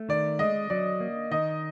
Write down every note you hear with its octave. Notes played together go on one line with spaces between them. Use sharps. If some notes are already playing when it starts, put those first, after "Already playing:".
Already playing: A3
D#3 D5
G#3 D#5
F#3 D5
A#3
D#3 D#5